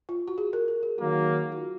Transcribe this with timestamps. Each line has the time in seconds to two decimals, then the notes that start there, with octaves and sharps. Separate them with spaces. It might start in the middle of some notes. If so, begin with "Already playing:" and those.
0.09 F4
0.28 F#4
0.38 G#4
0.53 A#4
0.68 A#4
0.83 G#4
0.98 D#3 F#3 A#3 F#4
1.52 F#4
1.57 F4